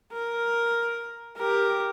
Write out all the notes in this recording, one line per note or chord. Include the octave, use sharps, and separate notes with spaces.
A#4
G4 A#4